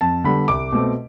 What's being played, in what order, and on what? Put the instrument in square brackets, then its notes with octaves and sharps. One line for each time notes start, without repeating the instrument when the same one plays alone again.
[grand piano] F2 A5
D3 G3 B3 D4 B5
C2 D6
B2 A3 C4